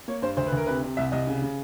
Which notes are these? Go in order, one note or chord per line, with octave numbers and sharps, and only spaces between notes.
A#3 C#5
G2 C5
D2 C5
B4
D2 A#4
C3 B4
C3
C2 E5
C2 D#5
C#3
C#3